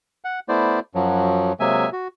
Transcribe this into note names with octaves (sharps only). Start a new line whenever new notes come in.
F#5
A3 B3 E4 C5 D5
F#2 F3 F#3
C3 F#3 G#3 A#3 E5 G#5
F#4